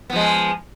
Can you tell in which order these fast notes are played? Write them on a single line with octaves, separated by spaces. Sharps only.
B3 F3 G#3